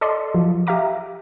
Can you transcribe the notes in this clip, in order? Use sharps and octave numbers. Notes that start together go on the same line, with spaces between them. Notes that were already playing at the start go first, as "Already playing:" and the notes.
A4 D5 D#5 C6
F3 F#3
G4 E5 F5 A#5 D6